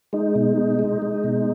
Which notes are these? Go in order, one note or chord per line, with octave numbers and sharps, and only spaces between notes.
G#3 D#4
B2
G#3
G#3
G#3
B2